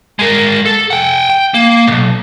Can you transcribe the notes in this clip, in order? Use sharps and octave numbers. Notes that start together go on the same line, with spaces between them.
G#3 A#4
A4
F#5 G5
G5
A#3
B1 A#2